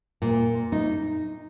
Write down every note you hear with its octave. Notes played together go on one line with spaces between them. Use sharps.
A#2
D#4